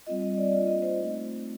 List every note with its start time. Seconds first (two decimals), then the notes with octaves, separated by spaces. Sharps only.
0.07 G3 C4 F4 D#5
0.22 D#5
0.37 D5
0.52 A#3 D4 F4 D#5
0.67 D#5
0.82 C5
0.98 A3 C4 D#4